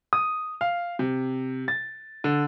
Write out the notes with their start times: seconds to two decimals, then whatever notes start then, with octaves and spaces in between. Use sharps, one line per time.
0.13 D#6
0.61 F5
0.99 C3
1.68 A6
2.24 D3